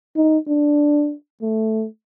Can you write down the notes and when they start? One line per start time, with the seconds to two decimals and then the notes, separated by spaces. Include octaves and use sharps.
0.16 D#4
0.48 D4
1.42 A3